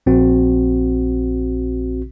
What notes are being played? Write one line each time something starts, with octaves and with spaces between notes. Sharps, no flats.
A#1 C4 F#4